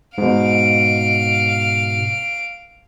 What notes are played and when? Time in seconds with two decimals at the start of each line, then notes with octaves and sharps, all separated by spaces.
0.18 G#2 B2 F5 D7